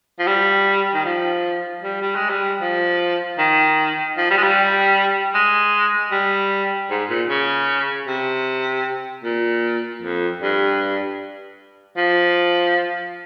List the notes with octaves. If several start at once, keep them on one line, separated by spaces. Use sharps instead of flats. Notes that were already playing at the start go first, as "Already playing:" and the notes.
F3
G3
D#3
F3
G3
G3
G#3
G3
F3
D#3
F3
G3
G#3
G3
G#3
G3
G#2
A#2
C#3
C3
A#2
F2
G2
F3